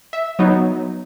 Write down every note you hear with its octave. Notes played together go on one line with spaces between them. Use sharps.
E5
F#3 B3 D#4